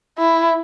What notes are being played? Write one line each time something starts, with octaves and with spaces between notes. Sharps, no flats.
E4